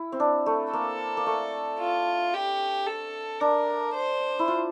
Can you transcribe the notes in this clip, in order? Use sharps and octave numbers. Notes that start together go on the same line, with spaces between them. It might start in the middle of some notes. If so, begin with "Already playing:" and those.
Already playing: E4
C4
D4
A3
A#3 A4
A#3
A3
F4
G4
A4
D4 A#4
C5
E4
F4